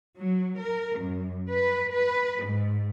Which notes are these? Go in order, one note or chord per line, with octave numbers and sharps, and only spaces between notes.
F#3
A#4
F#2
B4
B4
G#2